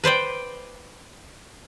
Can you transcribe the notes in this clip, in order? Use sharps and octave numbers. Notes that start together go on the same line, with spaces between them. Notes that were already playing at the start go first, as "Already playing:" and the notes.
B4 C5 D5 G5